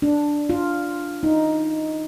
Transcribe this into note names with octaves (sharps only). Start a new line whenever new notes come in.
D4
F4
D#4